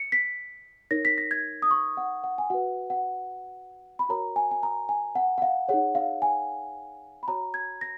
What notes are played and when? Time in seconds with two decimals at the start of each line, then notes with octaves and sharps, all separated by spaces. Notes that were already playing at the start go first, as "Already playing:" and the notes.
Already playing: C#7
0.12 B6
0.91 D#4 A#4 C#5 A#6
1.05 B6
1.18 A#6
1.31 G#6
1.62 D#6
1.71 C#6
1.97 F#5
2.24 F#5
2.38 G#5
2.50 F#4 B4 F#5
2.90 F#5
3.99 B5
4.09 F#4 A#4 C#5 A#5
4.36 G#5
4.51 G#5
4.63 A#5
4.89 G#5
5.15 F#5
5.38 F#5
5.42 F5
5.68 D#4 G#4 C#5 F#5
5.95 F5
6.22 G#5
7.23 B5
7.28 F#4 C#5 A#5
7.54 G#6
7.81 A#6